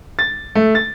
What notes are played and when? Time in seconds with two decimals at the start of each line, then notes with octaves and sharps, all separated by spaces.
0.19 A6
0.55 A3
0.75 A6